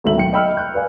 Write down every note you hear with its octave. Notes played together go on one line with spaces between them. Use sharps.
G#1 D2 A4 E5 F#7
B1 G5 C#7
D#5 G5 B5 E6 F6
F#6 G6
B4 D5 F5 G#5